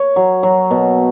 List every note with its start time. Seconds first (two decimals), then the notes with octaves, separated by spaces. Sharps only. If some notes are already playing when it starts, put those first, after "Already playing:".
Already playing: C#5
0.16 F#3
0.43 F#3
0.71 B2